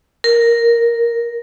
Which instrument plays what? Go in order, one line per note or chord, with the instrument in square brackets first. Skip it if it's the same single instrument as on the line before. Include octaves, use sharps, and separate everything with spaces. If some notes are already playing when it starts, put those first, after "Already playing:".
[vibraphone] A#4